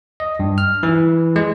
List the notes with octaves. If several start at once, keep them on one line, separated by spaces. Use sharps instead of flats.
D#5
G2
F6
E3
G#3